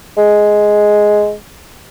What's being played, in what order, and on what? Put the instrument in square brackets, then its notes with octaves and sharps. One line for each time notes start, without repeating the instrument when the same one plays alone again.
[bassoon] G#3